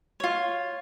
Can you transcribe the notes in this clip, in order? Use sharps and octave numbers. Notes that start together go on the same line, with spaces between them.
F4 C#5